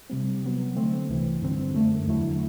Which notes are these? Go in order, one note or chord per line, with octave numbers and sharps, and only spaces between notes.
C3 G3 C4
C3 F#3 B3
D3 A3 C4
C2 C3 E3
G2 D3 G3 C4
F#2 D3 A3
E2 D3 F#3 A3 E4